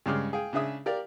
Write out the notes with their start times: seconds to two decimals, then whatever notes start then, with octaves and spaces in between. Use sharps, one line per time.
0.06 G2 C#3 G#3 D6 F6
0.33 G#4 F5 G5
0.53 C#3 D4 G#4 E5 D#6
0.86 G4 A#4 D5 F5